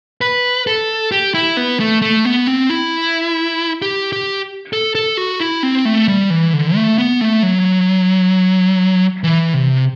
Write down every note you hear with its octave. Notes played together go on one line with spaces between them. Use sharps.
B4
A4
G4
E4
B3
A3
A3
B3
C4
E4
G4
G4
A4
A4
F#4
E4
C4
A3
G3
E3
D3
A3
B3
A3
F#3
E3
C3